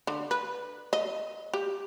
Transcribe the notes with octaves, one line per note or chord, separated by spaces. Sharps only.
D3
B4
D#5
G4